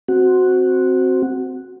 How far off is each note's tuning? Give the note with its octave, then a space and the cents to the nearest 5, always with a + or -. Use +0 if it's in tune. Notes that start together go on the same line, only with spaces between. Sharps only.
C4 +0 F#4 +0